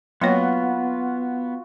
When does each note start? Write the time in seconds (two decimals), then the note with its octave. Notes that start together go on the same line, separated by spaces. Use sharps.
0.21 F#3 A#3 B3 F4 F#4 C#5